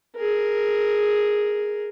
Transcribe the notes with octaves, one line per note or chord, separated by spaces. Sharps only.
G#4 A#4